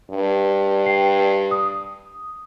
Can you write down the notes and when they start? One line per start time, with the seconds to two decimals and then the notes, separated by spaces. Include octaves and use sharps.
0.10 G2
0.86 G5 C7
1.51 D#6